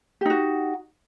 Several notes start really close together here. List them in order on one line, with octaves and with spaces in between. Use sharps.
G4 D#4 F#4